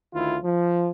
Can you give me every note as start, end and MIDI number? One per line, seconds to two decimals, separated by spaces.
0.13 0.37 38
0.13 0.37 51
0.13 0.37 64
0.13 0.37 65
0.42 0.91 53